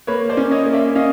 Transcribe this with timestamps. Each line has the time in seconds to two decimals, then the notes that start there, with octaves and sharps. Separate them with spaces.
0.07 A#3 B4 C#5
0.29 C5 D5
0.37 C#4
0.51 C#5 D#5
0.66 A#3
0.73 D5 E5
0.95 C#4 D#5 F5